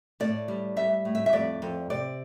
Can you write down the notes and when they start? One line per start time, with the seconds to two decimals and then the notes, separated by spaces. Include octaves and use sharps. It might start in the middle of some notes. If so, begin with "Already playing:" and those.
0.20 A2 D5
0.48 G3
0.76 G3 E5
1.05 A2
1.15 E5
1.26 E5
1.33 F2 D5
1.62 F2
1.90 C3 D5